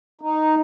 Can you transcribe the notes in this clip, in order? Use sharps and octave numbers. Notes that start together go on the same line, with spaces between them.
D#4